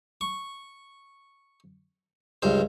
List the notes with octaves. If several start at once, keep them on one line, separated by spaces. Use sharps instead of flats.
C#6
C#2 G2 C5